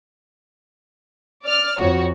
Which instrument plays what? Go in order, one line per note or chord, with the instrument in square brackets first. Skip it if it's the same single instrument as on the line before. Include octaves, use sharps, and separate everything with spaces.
[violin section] D5 F6
[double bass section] F2 [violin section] F#4 C#5